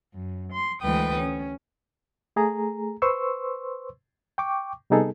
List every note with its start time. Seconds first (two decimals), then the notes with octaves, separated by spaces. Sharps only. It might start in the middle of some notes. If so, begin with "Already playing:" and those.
0.13 F#2
0.52 C6
0.81 D2 E3 G#3 B4 G5 D#6
1.18 C#4
2.36 A3 G#4 A#5
3.02 B4 C5 C6 C#6 E6
4.38 G5 C#6 D6
4.90 C3 G3 B3 D#4 G#4 A4